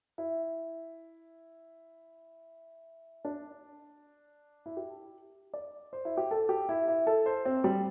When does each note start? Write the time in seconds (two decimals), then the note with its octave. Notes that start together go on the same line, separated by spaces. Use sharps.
0.18 E4
3.25 D4
4.66 E4
4.77 G4
5.54 D5
5.93 C5
6.05 E4
6.17 G4
6.31 A4
6.49 G4
6.69 E4
6.88 E4
7.07 A4
7.26 C5
7.45 C4
7.64 G3